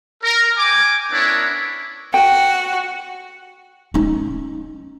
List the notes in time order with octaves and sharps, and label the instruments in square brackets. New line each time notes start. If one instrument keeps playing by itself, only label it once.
[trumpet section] A#4
G5 G#5 D6
B3 C#4 D4 E4 A#4 C#5
[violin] F#4 [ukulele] G5
[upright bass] C#4 D#4